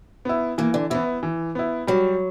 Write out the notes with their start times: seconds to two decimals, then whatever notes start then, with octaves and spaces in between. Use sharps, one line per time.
0.25 B3 E4
0.58 E3 A#3
0.74 D3
0.90 E3 B3 E4
1.23 E3
1.55 B3 E4
1.87 F#3 G3